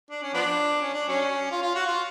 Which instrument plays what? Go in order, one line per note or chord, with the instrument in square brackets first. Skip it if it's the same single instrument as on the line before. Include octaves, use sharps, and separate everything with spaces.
[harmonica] D4
C#4
F3 B3 D4
C#4
D4
F#3 C#4
F4
F4
F#4
F4